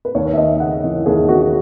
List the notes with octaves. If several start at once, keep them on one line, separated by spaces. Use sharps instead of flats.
B4
D#2 C#5
E5
D#2 D#5
C#3 F#5
E3
D#2 G#4
D#2 F#4